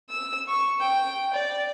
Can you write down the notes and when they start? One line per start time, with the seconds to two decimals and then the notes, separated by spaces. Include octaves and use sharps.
0.10 E6
0.48 C#6
0.81 G5
1.34 D5